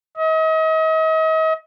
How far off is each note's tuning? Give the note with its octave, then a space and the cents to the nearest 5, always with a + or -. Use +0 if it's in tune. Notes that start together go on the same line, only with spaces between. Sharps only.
D#5 +40